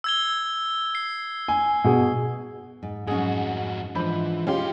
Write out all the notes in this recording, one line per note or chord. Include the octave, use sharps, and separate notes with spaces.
E6 G#6 G7
C7
G#5
B2 G#4
G#2
F2 G#2 F#3 C#4 F#4 G#4
G#2 E3 F3 G#3 D4 C5 B5
B2 G#3 C#4 F4 G4 C6